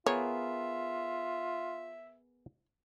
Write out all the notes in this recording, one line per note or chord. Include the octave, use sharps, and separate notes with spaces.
B3 F4 G#4 A#4 C#5 E5